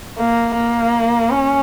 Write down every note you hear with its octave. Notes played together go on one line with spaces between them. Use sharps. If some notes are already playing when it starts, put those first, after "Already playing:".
A#3
A#3
C#4